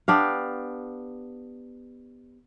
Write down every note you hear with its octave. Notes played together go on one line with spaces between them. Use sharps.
B3 D4 G4 F5